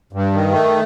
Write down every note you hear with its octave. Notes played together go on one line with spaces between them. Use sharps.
G2
D#3
A3